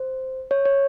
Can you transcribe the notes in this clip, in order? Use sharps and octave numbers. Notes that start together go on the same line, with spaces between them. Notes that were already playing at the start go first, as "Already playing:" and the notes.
Already playing: C5
C#5
C#5